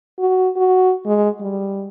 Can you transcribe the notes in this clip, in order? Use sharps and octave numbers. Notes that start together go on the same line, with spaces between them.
F#4
F#4
G#3
G3